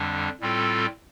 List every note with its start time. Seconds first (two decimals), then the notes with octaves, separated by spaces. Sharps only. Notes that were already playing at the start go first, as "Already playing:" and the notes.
Already playing: F2 D3 G3 D4
0.40 A2 G3 C4 F4 A4